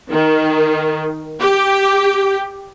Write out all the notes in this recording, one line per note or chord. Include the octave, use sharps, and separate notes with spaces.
D#3
G4